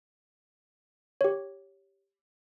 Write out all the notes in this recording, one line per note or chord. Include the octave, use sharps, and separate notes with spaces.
G4 C#5